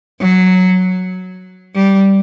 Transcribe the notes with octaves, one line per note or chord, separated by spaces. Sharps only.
F#3
G3